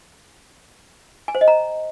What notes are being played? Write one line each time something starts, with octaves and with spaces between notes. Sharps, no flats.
G#5
C5
D#5
A#5